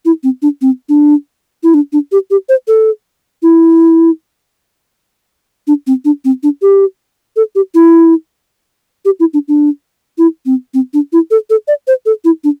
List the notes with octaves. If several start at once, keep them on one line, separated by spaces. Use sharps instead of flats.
E4
C4
D4
C4
D4
E4
D4
D4
G4
G4
C5
A4
E4
D4
C4
D4
C4
D4
G4
A4
G4
E4
G4
E4
D4
D4
E4
C4
C4
D4
E4
A4
A4
D5
C5
A4
E4
D4